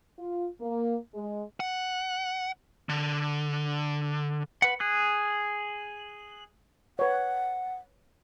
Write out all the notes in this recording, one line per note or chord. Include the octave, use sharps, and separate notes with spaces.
F4
A#3
G#3
F#5
D3
B4 F#5
G#4 F#6
B4 C#5 F#5